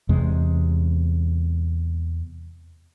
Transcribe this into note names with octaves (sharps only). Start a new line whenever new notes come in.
E2 C3 G#3